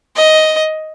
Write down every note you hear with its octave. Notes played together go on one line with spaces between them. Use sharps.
D#5